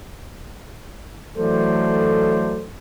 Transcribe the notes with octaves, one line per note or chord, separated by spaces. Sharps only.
E3 F#3 A3 A4 C5 D5